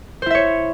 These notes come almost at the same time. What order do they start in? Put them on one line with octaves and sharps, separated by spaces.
C5 E4 E5 C#5